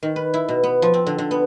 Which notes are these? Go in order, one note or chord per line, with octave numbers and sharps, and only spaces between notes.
D#3
B4
E4
B2
B3
F3
C4
D3
D3
B3